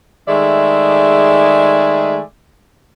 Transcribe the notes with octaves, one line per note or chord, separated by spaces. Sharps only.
D#3 G#3 A3 G#4 D5 E5